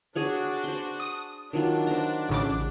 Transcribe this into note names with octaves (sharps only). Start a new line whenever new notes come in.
D4 F#4 G#4 C#5 F#5
C5 C6
D#6
D#3 F#3 D4 F4
C5 A#5
A1 C#3 D6